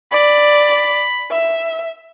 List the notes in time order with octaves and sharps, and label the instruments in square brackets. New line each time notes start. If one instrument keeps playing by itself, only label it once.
[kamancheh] D5 [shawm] B5
[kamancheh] E5